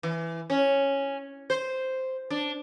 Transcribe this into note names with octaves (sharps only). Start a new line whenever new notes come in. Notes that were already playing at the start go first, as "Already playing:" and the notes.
E3
C#4
C5
D4